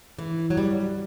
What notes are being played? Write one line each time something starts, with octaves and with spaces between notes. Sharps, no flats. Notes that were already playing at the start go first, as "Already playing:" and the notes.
E3
F#3
G3